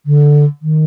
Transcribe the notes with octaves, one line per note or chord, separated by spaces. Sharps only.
D3
D#3